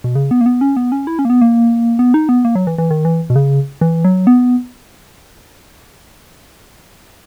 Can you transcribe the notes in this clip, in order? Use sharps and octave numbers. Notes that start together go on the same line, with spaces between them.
B2
C#3
B3
A#3
B3
C#4
B3
C#4
E4
C#4
A#3
B3
A#3
B3
D#4
B3
A#3
F#3
E3
E3
D#3
E3
B2
C#3
E3
F#3
B3